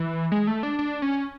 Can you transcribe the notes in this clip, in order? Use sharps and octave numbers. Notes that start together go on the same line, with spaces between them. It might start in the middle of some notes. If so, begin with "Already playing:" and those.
Already playing: E3
G#3
A3
D4
D4
C#4